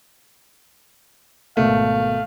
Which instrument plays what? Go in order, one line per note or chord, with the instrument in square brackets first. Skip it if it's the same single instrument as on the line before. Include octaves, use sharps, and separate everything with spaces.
[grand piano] G#1 B2 A#3 [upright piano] A3 [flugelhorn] F5